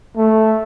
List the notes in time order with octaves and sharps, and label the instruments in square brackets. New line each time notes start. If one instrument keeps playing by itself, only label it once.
[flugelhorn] A3